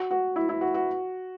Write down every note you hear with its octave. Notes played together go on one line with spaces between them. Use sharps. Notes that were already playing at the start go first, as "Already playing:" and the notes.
Already playing: F#4
F#4
E4
E4
F#4
F#4